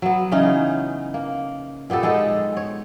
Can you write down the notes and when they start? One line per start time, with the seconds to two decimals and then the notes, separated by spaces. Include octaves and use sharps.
0.02 F#3 B3
0.32 C#3 E3 C#4 D#4
1.14 A#3
1.90 A#2 B3 G4 A4
2.03 G#3 B3 D#4 A4
2.57 C#5